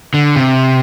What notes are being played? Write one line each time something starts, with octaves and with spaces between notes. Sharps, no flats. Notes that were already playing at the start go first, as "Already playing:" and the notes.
D3
C3